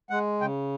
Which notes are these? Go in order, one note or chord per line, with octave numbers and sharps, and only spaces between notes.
G#3 F#5
C#3 G5